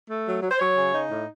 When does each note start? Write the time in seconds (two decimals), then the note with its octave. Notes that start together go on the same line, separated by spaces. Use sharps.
0.09 A3
0.26 F#3
0.42 F#3
0.51 C5
0.59 F#3 C#5
0.77 C#3
0.93 D#4
1.10 A2